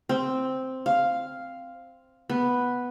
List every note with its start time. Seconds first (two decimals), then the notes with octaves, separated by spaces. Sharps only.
0.09 C4
0.86 F5
2.30 B3